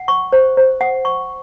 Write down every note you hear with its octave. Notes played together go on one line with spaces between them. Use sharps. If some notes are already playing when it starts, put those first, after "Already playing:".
Already playing: F#5
C#6
C5
C5
F#5
C#6